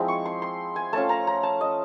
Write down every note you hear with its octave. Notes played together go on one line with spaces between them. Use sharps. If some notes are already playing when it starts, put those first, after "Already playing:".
Already playing: F3 G#3 C4 E4
C#6
C6
C6
G#5
A3 C#4 F4 A5
A#5
A#5
A5
D#5